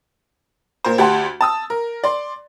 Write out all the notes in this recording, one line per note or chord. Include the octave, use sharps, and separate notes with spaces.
A#2 A#4 C5
D2 G4 F#5 A5 C6
A5 D#6 E6
A#4
D5 C6